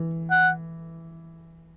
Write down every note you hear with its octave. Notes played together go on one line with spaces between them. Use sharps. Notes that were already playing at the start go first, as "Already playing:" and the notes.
Already playing: E3
F#5